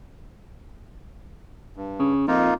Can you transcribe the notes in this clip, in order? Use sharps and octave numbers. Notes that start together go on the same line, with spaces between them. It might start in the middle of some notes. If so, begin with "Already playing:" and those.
G2
C#3
F2 A#3 D#4 F4